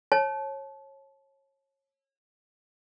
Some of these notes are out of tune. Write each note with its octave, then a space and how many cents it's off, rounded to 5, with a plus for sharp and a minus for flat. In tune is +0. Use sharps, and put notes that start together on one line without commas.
C#5 -25 A5 -25